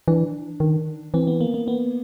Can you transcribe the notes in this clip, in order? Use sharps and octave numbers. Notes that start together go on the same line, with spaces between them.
E3 D4
D#3
E3 C4
B3
A#3
A#3
B3